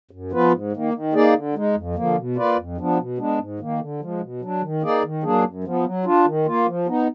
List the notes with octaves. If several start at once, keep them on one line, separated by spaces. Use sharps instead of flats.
F#2
F3 B3 F4 B4
G#2
D#3 A#3
D#3
A#3 D#4 G#4 D5
D3
G#3 D#4
F2
D3 F3 A#3
B2
A#3 F4 B4 D5
F2
F3 B3 D4
B2
G#3 B3 D4
G#2
D#3 A#3
D3
F3 G#3
B2
F#3 D4
D#3
A#3 D#4 G#4 D5
D#3
F#3 A#3 D4 G#4
F#2
F3 B3
F#3
D4 F4
D#3
A#3 F4
F3
B3 D#4